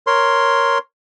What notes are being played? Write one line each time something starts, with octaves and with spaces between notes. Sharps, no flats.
A#4 C#5 C6